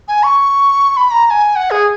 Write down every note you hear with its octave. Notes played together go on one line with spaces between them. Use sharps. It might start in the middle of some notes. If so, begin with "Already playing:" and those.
G#5
C#6
B5
A#5
A#5
G#5
F#5
G#4